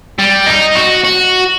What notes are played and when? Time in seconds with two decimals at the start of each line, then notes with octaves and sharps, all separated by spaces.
0.19 G3
0.47 D#4
0.76 F#4
1.04 F#4